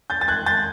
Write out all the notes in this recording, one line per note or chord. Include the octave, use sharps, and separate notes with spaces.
G6 A6
A6
F#6 G#6
G6 A6